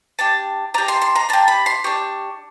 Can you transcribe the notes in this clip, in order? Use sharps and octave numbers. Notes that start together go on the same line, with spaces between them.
D4 G4 A5
D4 G4 A#5
C6
C6
A#5
D4 G4 A5
B5
C6
D4 G4 C#6